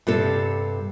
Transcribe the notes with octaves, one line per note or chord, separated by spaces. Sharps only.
G2 C3 A4